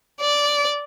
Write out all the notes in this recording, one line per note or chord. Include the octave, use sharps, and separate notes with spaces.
D5